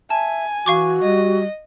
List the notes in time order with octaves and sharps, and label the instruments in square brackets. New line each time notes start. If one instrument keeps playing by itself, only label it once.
[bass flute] E5 [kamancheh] G#5 [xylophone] A5
[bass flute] E3 [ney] F#4 [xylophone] F5 C#6 D6
[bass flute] G3 [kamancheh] D#5